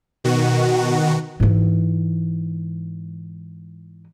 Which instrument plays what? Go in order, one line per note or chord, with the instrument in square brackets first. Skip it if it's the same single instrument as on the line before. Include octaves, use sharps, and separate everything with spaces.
[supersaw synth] B2 D#3 F#4
[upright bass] G#2 E3